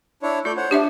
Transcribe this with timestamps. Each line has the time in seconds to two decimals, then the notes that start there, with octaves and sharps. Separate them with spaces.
0.23 D4 E4 C#5
0.45 A3 F4 D5 G6
0.57 C5 C#5 F#5
0.71 D4 G4 D5 E5